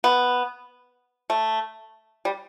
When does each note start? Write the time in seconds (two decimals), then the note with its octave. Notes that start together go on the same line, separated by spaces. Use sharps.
0.04 B3
1.30 A3
2.25 G3